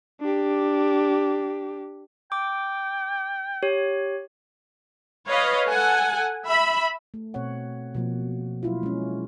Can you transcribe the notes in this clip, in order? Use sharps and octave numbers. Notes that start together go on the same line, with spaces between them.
D4 G4
G5 D6
G4 C#5
B4 C#5 D#5 F5
A4 F#5 G#5
E5 B5
A3
B2 C4 C#5 F#5
B2 F3 A#3
F#3 E4 F4
G#3 C#4